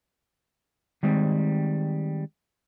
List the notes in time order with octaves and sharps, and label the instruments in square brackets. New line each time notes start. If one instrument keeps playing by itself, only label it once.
[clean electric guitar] D#3 G3 G#3 C4